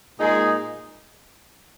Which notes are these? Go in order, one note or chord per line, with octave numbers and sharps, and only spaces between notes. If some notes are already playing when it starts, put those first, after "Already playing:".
A#2 G#3 D#4 G#4